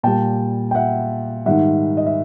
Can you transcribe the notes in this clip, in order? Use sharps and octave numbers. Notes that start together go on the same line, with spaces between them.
A#2 G3 G5 A5
G5
E5 F#5
G#2 D#3 G3 E5 F#5
D#5
E5